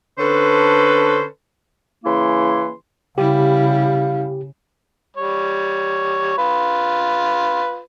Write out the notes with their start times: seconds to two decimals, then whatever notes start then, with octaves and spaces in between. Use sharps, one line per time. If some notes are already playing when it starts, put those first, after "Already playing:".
0.18 D3 C#4 A4 B4 C5
2.04 C#3 E3 A#3 E4 C6
3.18 C#3 G3 E4 G4 F5
5.17 G3 C#5
6.38 F4 B4